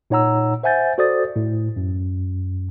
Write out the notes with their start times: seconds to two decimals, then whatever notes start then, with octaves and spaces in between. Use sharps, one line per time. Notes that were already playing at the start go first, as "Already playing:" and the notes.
0.10 A#2 D#4 C#5 F#5 A#5 E6
0.63 C5 E5 F#5 G#5 G6 A6
0.98 F#4 A4 C5 D5 D#6 A6
1.36 A2
1.76 F#2